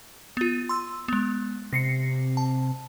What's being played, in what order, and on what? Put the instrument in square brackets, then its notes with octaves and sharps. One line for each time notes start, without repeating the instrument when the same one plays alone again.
[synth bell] B3 F4
C6 E6
G#3 B3
[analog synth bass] C3 [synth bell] A#6 C7 C#7
[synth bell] A5